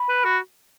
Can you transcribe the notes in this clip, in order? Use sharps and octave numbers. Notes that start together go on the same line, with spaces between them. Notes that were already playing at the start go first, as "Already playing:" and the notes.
Already playing: B5
B4
F#4